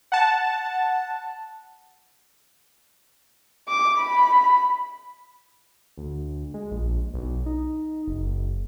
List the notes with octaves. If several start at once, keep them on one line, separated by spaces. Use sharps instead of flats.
F#5 A5
D6
B5
D2
G#3
A#1
B1
D#4
F#1
F#1